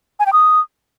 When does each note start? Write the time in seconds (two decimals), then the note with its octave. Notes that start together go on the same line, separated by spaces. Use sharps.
0.20 G#5
0.26 G5
0.33 D#6